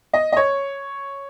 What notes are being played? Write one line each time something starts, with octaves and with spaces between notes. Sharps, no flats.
D#5
D#5
C#5